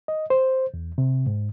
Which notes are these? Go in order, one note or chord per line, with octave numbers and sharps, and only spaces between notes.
D#5
C5
E2
C3
G#2